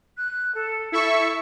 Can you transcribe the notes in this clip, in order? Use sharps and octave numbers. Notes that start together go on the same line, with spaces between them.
F#6
A4
E4 A4 E5 C#6